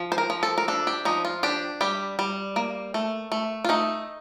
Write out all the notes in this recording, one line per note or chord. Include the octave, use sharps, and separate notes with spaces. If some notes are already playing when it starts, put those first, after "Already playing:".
Already playing: F3
C5
A#4
F3
A4
A#4
D4 A4
G4
F3 D#4
F4
D4 G4
G3 G4
G3
A#3
A3
A3
F4
A3 D#4